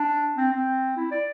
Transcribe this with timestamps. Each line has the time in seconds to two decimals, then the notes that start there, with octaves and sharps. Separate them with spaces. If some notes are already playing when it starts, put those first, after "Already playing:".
Already playing: D4
0.37 C4
0.52 C4
0.97 E4
1.11 D5